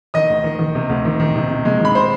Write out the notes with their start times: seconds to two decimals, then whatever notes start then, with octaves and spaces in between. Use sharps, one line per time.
0.14 D#3 D#5 D#6
0.30 D2
0.44 D#3
0.59 D#3
0.75 C3
0.89 D2
1.05 D#3
1.20 D#3
1.35 C3
1.50 C3
1.65 G#3
1.80 D#3 B5
1.95 C5 C6